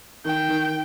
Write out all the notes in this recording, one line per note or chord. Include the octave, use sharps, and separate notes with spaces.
D#3 G5
D#3